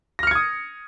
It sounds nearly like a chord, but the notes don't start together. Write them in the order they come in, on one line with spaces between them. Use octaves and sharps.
A#6 F6 C#7 G#6 D#6